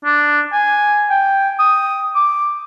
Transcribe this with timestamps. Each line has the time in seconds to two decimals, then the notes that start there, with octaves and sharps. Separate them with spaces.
0.05 D4
0.53 G#5
1.10 G5
1.59 D#6
2.15 D6